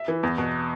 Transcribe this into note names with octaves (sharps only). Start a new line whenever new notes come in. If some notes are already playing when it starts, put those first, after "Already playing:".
Already playing: E5
E3
E2
B2